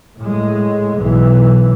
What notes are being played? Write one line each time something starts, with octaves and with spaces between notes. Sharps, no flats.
A2 G#3
B1 E3